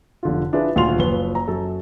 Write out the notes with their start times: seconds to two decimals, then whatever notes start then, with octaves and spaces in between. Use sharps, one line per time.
0.23 F1 D3 F4
0.53 D4 E4 F4 G#4 B4
0.75 D#1 D2 F4 C6 F7
0.99 F#1 F3 B4 G7
1.35 A#5
1.48 F#2 F#3 A4